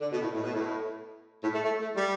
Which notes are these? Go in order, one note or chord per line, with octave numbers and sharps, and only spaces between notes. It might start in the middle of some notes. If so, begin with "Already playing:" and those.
D3
B2
A2
A2
B2
A2
A2
A3
A3
A3
G3